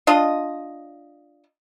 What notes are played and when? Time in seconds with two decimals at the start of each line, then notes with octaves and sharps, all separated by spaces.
0.07 D4 F4 D#5